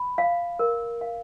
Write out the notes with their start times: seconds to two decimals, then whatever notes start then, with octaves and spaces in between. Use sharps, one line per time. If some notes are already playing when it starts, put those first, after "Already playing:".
Already playing: B5
0.18 F5
0.59 A#4
1.01 F5